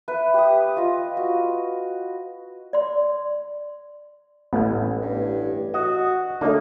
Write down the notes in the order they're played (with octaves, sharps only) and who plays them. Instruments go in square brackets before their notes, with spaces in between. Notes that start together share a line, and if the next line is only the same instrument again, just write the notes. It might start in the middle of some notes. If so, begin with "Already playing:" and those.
[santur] B4 E5
G4 D#6
F4 D#5
F#4
[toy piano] D5 C6
[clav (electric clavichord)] A1 [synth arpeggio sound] A3 B3
[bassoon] G2
[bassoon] F#4 [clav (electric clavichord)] D#5
[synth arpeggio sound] D3 A3 [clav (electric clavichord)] A#3 [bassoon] D#4